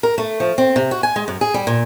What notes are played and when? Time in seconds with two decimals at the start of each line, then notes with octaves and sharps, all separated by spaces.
0.03 A#4
0.18 A3
0.40 F3
0.58 C4
0.76 C3
0.91 F#4
1.03 G#5
1.16 G#3
1.28 F#2
1.41 G#4
1.54 G3
1.67 A#2